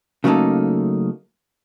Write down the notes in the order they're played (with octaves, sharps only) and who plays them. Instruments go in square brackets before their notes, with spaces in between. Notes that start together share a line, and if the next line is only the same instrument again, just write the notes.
[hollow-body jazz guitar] C#3 F#3 A3 A#3 D#4 A4